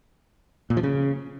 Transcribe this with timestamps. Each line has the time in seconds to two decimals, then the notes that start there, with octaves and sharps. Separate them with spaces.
0.70 A#2
0.77 F3
0.83 C#3